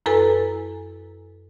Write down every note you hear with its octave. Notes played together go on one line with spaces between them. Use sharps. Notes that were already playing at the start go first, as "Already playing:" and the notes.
F#2 E4 A4 B4 G#5 A#5